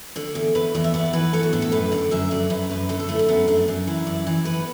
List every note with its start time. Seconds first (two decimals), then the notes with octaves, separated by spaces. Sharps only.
0.16 D3 D5
0.35 E2
0.55 E2 B4
0.75 E2 D5
0.84 E5
0.94 B3 D5
1.13 E3 B4
1.33 B3 A4
1.43 F#4
1.53 A2 D4
1.62 A4
1.72 F#2 B4
1.92 D3 D5
2.11 F#2 E5
2.31 F#2 D5
2.50 F#2 B4
2.70 F#2 B4
2.89 D3 A4
3.00 A4
3.09 A3 E4
3.19 D4
3.28 F#2 B3
3.48 F#2 D4
3.68 F#2 D4
3.87 E3 E4
4.07 F#2 D5
4.27 E3 D5
4.45 B3 B4